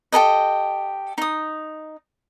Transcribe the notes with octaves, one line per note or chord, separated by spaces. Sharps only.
G4 A4 A#4 D#5
D#4 D#6